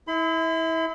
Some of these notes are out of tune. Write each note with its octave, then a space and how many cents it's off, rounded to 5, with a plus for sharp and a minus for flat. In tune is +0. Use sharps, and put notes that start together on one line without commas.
E4 -30 B5 +40